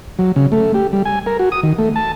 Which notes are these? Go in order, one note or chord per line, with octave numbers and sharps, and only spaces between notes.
F#3
C#3
A3
G4
G3
G#5
A#4
F#4
D#6
D#3
A3
A5